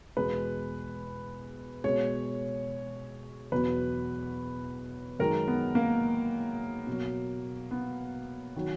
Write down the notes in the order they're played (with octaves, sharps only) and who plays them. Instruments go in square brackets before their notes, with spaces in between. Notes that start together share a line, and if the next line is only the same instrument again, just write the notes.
[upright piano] E2 B2 G#3 B4
B2 G#3 C#5
E2 B2 F#3 B4
F#2 D#3 G#3 A#4
B3
A#3
B2 F#3
B3
D#3 F#3